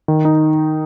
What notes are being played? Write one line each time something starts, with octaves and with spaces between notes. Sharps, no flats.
D#3
D#4